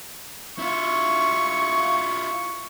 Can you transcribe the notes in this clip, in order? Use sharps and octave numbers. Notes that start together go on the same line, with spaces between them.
E4 F4 C#6